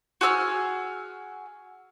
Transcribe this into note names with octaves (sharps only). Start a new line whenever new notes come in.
F#4 G#4 E6 F6